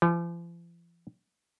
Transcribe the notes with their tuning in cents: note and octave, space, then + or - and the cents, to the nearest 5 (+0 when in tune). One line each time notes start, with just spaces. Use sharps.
F3 -40